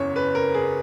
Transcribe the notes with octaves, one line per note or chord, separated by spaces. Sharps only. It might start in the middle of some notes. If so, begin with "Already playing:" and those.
Already playing: F#1 E2 C#3 C#5
B4
A#4
G#4